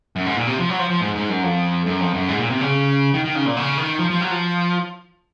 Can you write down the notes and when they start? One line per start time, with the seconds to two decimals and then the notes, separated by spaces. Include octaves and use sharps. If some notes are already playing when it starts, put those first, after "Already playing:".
0.16 F#2
0.26 G#2
0.36 A#2
0.47 C3
0.58 F3
0.69 F#3
0.79 F3
0.90 F3
1.01 G#2
1.15 G#2
1.29 F#2
1.43 F2
1.86 F#2
2.00 F2
2.14 F#2
2.29 G#2
2.39 A#2
2.50 C3
2.61 C#3
3.14 D#3
3.25 D#3
3.35 C#3
3.46 A#2
3.57 C#3
3.77 D#3
3.99 F3
4.10 F3
4.20 F#3
4.31 F3